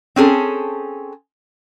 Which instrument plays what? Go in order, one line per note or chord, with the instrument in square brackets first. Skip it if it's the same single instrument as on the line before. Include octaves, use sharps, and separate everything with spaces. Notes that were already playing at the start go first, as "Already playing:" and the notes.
[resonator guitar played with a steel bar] C4 C#4 G#4 A4